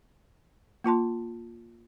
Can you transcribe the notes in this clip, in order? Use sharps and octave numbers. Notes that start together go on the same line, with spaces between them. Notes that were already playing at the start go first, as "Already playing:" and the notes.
A#3 F4 A5 C6